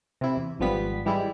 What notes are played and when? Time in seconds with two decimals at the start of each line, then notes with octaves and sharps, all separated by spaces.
0.21 C3 E4
0.36 E2
0.60 G#1 F3 G3 B3 B6
1.06 E3 G3 G#3 E4